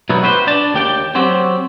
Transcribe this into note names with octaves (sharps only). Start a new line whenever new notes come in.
B2 F#3 B3 D#4 E4
F#4 G4 B4 C5
D4 D5 A5
D#2 G4 G5
F#3 C4 F#4 G4 C5